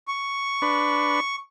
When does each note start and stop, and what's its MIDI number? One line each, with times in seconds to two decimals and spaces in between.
0.08 1.36 85
0.62 1.20 62
0.62 1.20 71